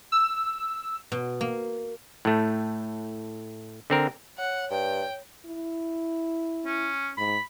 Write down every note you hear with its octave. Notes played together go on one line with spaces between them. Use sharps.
E6
B2
A#3
A2 A3
D3 C4 A#4
C#5 F#5
G2 G5
E4
C#4
G#2 B5